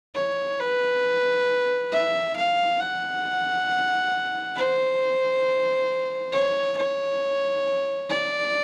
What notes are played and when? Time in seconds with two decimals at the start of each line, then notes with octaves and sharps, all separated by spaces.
0.15 C#5
0.59 B4
1.92 E5
2.36 F5
2.80 F#5
4.56 C5
6.33 C#5
6.77 C#5
8.10 D5